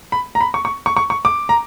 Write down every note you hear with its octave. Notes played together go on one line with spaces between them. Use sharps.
B5
A#5
B5
C#6
C#6
C#6
C#6
C#6
D6
A#5